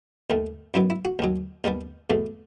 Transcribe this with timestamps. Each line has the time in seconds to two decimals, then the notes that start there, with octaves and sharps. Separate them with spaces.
0.30 D#2 D#3 A3
0.74 F#2 D#3 F#3 B3 E4
0.90 E4
1.05 F#4
1.19 D#2 D#3 F#3
1.64 D#2 D#3 G3 B3
2.10 E2 B2 A3